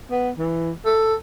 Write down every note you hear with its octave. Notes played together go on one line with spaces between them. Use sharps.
B3
E3
A4